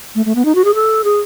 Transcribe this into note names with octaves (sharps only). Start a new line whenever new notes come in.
A3
A3
B3
D#4
F#4
G#4
A4
G#4